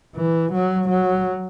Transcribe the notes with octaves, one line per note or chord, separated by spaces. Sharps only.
E3
F#3
F#3